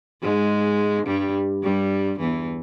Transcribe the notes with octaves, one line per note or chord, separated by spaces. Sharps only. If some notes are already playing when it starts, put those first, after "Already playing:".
G#2 G#3
G2 G3
G2 G3
E2 E3